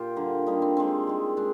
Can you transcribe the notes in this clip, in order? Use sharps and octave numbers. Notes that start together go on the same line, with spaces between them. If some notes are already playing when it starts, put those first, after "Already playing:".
Already playing: A#2 F4 G4
D3 G3 A#3
D3 G3 A#3 D#4
C4
D#3 G#3 C4
D#3 G#3
G#3 D4